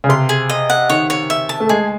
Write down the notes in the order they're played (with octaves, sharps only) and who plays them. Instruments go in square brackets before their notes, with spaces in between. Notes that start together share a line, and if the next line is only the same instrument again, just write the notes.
[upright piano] C#3
[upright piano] C3 [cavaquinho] C6
[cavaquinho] G#4
D#5
F#5
[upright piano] D#3 [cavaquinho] C#5
[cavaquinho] C#5
E5
A5
[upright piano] A3
[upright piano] G#3 [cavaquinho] G#4